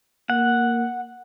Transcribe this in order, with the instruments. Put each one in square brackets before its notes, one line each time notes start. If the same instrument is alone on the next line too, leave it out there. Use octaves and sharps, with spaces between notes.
[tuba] A#3 [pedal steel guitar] F#5